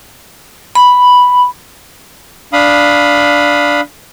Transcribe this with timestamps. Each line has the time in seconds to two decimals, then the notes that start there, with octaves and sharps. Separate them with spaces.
0.75 B5
2.53 D4 F5 B5 D#6